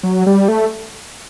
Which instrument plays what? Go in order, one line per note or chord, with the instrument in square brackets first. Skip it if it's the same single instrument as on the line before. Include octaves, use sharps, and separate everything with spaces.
[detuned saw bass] F#3
G3
A3